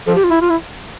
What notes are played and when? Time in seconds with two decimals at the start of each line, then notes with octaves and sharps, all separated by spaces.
0.07 F3 A4
0.15 G4
0.24 F4
0.30 E4
0.42 F4
0.50 E4